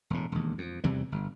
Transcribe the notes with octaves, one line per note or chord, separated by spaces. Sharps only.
E1 A2
E1 D#2
F2
E2 C3 E3 G3
G1